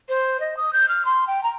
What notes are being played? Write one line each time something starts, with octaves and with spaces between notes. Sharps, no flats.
C5
D#5
D#6
G6
F6
C6
G5
A#5